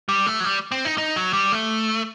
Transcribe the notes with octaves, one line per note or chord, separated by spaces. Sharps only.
G3
A3
F#3
G3
C4
D#4
D#4
F#3
G3
A3